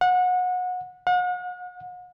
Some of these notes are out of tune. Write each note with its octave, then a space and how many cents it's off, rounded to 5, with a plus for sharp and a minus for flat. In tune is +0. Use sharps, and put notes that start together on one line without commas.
F#5 -25
F#5 -40